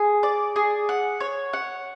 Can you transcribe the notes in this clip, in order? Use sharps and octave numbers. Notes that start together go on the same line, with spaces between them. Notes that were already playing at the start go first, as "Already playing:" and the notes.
Already playing: G#4
D5
G#4
F#5
C#5
F#5